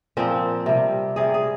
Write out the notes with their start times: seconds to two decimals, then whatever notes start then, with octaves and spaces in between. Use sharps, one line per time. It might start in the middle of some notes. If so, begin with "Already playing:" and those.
0.17 A#2 F3 C4
0.66 C3 G3
1.16 C3 G3 G#4
1.34 G#4